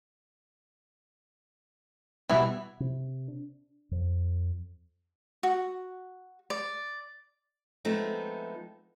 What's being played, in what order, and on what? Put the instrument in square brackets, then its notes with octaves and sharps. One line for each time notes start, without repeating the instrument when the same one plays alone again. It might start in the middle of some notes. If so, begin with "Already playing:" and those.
[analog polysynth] B2 G3 B3 [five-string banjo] E3 E4
[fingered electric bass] C3
D4
F2
[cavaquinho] F#4
D5
[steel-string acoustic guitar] F3 G#3 A3 B3 C4 D#4